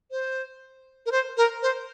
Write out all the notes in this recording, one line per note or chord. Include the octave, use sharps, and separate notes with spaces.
C5
A#4
C5
A#4
C5